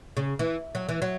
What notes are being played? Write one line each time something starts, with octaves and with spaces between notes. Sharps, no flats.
C#3
E3
F#3
E3
F#3